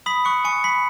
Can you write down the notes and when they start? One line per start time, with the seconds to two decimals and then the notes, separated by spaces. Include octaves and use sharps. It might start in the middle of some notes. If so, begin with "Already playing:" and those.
0.06 B5 D#6 B6
0.25 C#6 F#6 C#7
0.44 G#5 C#6 C#7
0.64 B5 B6